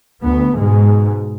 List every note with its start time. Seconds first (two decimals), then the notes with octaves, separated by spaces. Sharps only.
0.22 D2 B3
0.56 G#2 B2 G#3